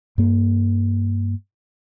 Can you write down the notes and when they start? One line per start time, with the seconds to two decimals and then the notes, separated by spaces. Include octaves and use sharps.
0.18 G2 A#3